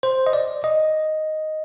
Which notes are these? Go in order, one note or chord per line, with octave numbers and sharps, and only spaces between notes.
C5
D#5
D5
D#5